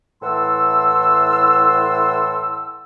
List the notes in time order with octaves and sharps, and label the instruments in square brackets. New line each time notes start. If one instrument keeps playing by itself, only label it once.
[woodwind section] A2 E3 F#5 A5 C6 E6